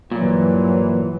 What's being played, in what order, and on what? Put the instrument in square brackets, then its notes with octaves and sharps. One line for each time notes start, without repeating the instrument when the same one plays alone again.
[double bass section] G2 E3 F#3 [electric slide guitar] A#2